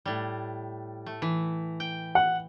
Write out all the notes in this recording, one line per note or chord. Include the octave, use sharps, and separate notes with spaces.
A2 G3
A3
E3
G5
F#5